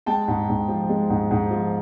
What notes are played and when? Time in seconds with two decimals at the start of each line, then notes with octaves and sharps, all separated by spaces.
0.06 G#3 G5 A5
0.28 G#2
0.49 G#2
0.68 F3
0.89 G#3
1.10 G#2
1.31 G#2
1.51 F3